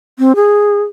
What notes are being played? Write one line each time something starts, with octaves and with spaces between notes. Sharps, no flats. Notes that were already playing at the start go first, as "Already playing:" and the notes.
C4
G#4